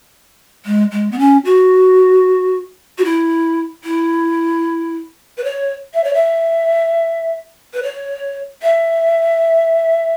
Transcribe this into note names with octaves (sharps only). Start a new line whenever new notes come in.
G#3
G#3
B3
C#4
F#4
F#4
E4
E4
B4
C#5
E5
C#5
E5
B4
C#5
E5